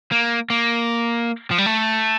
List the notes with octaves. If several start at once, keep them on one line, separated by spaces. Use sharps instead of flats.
A#3
A#3
F3
G3
A3